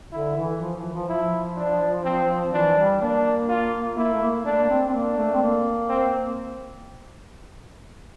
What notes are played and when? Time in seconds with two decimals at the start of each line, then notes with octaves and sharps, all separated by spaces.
0.12 D3 E4
0.37 E3
0.61 F3
0.76 E3
0.93 F3
1.08 F3 E4
1.57 D4
2.04 C4
2.53 E3 D4
2.77 G3
3.01 A#3 D4
3.49 F4
3.97 A#3 E4
4.13 A3
4.21 A#3
4.45 A3 D4
4.59 A#3
4.69 C4
4.87 C4
4.93 A#3 D4
5.17 A3
5.33 C4
5.41 A#3
5.89 C4